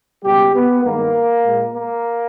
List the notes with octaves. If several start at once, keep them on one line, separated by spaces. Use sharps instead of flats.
C#2 B2 G3 G4
B3
G2 D#3 G#3 A#3
A#2 G#3
A#3